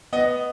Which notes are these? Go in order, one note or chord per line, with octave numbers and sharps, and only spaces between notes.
B3 D#5